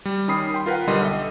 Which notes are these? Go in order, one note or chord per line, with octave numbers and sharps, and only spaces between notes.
G3
D#3 C#4 B5 D#6 C7
G5 C6
F4 A#4 B4 F5 F#5
B1 D3 G3 D#5 C6 D#7
A4 D#5 E5